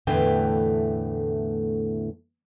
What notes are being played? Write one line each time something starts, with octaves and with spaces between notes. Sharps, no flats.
E2 A2 D3 E3 A3 G5